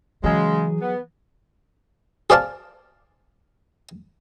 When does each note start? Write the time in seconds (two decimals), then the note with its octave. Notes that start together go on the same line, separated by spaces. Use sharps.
0.24 C#3 E3 F#3 G#3 G#4
0.81 B3
2.30 G#4 C5 D5 F5 A5